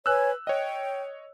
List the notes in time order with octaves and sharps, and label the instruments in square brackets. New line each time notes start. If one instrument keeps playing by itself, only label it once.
[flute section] B4 C#5 G#5 [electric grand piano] E6 F#6
[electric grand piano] C#5 D#5 [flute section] G5